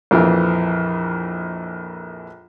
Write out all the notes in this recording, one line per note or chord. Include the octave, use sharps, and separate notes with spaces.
A#1 F2 E3